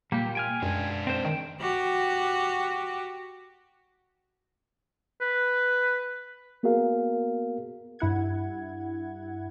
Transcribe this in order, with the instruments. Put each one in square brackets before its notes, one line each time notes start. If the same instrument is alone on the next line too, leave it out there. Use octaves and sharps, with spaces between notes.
[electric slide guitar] A#2 [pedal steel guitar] G3 G4 [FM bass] A#3
[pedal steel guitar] G5 G#5 F6
[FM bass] F#2 [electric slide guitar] G#3 D4
[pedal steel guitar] C4 C5
[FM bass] D#3 [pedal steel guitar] G5
[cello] F#4 G4
[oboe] B4
[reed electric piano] A#3 B3 F#4 G#4 A#4 F5
[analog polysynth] G2 E4 F#5 G#6